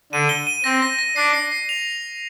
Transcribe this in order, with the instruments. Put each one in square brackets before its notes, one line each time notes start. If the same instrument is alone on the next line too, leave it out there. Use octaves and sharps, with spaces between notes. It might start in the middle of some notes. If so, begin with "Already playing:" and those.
[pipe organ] D3 [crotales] D#7
[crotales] G7
D#7
[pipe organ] C4 [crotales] A#6
[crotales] A#6
A#6
[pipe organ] D4 [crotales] C7
[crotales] C7
C7
F7